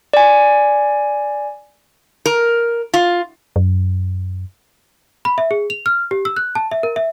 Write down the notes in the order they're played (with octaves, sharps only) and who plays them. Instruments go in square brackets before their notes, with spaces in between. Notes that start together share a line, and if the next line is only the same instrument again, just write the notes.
[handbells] D5 G#5
[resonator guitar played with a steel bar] A#4
F4
[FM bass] F#2
[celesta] B5
E5
G#4
F7
F6
G4
E6
F#6
A5
E5
A#4
E5